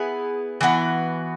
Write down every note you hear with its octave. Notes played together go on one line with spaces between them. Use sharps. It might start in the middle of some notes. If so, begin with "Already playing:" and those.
Already playing: B3 E4 G#4
E3 B3 F#4